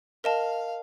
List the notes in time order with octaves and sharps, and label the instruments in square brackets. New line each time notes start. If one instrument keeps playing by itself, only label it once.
[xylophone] A#4 D#5 A5 [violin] F5